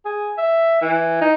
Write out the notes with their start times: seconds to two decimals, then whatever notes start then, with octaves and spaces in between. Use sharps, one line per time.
0.05 G#4
0.38 E5
0.82 E3
1.21 D#4